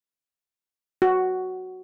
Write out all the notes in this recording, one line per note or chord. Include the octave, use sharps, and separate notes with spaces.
F#4